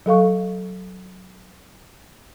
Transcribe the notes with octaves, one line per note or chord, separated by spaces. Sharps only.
F#3 A4 F5 C#6